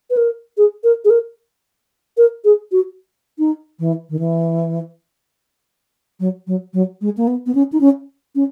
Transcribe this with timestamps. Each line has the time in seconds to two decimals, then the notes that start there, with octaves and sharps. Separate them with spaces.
0.10 B4
0.17 A#4
0.57 G#4
0.84 A#4
1.05 G#4
1.10 A#4
2.17 A#4
2.45 G#4
2.72 F#4
3.39 D#4
3.79 E3
4.10 D#3
4.19 E3
6.20 F#3
6.47 F#3
6.74 F#3
7.01 G#3
7.17 A#3
7.27 B3
7.46 B3
7.55 C#4
7.72 D#4
7.81 C#4
8.35 C#4